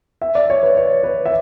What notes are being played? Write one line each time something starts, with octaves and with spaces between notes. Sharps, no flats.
E5
D5
C#5
B4
C#5
B4
E5